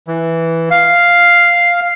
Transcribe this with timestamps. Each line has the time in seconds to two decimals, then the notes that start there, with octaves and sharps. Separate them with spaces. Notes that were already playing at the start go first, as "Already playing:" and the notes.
0.08 E3
0.71 F5